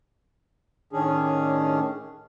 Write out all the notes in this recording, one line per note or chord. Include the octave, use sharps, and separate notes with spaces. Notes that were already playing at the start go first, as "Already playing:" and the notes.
A2 D#3 C#4 D4 G#4